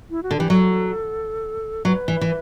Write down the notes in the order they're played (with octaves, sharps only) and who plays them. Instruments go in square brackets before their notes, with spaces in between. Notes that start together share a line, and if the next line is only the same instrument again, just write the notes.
[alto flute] E4
F#4
[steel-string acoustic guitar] D3
[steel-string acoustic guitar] E3 [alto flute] G4
[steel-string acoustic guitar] F#3 [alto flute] A4
[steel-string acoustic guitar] F#3 [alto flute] B4
[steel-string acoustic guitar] E3
E3